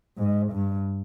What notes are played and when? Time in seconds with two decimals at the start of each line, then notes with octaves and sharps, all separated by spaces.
0.17 G#2
0.52 G2